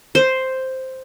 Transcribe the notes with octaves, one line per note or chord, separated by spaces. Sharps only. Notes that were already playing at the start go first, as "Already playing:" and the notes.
C5